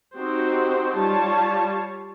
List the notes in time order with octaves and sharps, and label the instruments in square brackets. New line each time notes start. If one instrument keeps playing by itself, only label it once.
[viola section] C4 D#4 F#4 G4 C5
G3 F4 C#5 A5